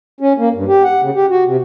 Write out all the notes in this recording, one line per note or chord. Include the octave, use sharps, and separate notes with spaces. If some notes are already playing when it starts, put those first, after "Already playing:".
C#4
A#3
G2
G4
F#5
C#3
G4
F#4
C3